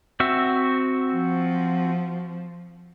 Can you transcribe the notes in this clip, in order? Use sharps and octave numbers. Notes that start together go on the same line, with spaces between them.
C4 F#4 E5
F3